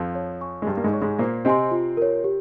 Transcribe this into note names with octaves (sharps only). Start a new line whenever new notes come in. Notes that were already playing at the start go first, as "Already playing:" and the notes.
Already playing: F2 F3
C#5
G#5 C#6
G#3
G2 G3 G4
A#3
G#2 G#3
C#5 G#5 C#6
G#2 G#3
A#2 A#3 C5
C3 C4 D#5 G#5 C6
F4
A#4 C#5
G4